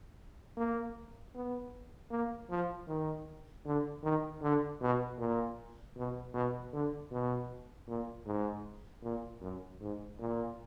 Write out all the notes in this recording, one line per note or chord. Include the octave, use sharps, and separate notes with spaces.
A#3
B3
A#3
F3
D#3
D3
D#3
D3
B2
A#2
B2
B2
D3
B2
A#2
G#2
A#2
F#2
G#2
A#2